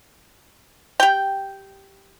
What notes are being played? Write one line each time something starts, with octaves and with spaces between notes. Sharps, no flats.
G4 G5